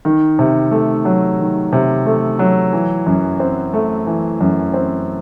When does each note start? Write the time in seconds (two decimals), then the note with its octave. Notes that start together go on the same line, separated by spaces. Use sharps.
0.05 D#3
0.39 C3
0.71 A3
1.05 F#3
1.39 D#3
1.73 C3
2.06 A3
2.39 F#3
2.73 E3
3.06 F#2
3.40 C4
3.73 A3
4.07 E3
4.41 F#2
4.74 C4